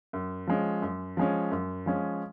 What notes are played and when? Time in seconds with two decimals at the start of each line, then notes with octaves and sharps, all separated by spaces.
0.13 F#2
0.47 F3 G#3 C#4
0.82 F#2
1.17 F3 G#3 C#4
1.51 F#2
1.86 F3 G#3 C#4